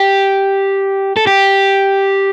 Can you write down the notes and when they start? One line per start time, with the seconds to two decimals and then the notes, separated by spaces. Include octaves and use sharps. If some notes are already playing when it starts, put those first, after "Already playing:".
Already playing: G4
1.17 A4
1.27 G4